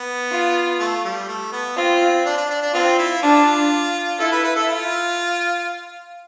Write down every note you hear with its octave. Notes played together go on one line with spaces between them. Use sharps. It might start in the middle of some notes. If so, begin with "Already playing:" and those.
Already playing: B3
F4
A3
G3
A3
B3
C4 F4
D4
D4
D4
D4
C4 F4
E4
D4 F4
E4 A4
B4
B4
A4
F4